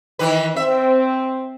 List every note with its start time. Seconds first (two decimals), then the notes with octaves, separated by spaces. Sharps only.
0.19 D#3 E3 B4
0.56 C4 E5